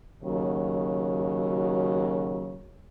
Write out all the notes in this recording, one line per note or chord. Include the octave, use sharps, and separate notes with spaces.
D#2 C#3 F#3